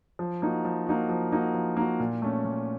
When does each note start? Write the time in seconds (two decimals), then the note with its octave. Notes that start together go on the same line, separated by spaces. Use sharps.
0.19 F3
0.42 A#3 D#4 F#4
0.65 F3
0.86 A#3 D#4 F#4
1.09 F3
1.32 A#3 D#4 F#4
1.54 F3
1.77 A#3 D#4 F#4
2.00 A#2
2.22 A3 C#4
2.45 A#2